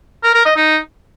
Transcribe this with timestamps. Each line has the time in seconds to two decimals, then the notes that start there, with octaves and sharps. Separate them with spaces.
0.23 A#4
0.34 A#4
0.45 D#5
0.56 D#4